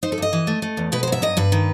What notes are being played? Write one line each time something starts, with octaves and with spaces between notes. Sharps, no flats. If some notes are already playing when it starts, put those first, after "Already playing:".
D#4 C5
A4
G2 D#5
E3
A3
A3
E2
B2 B4
C5
F#3 E5
G2 D#5
G2 B4
D#3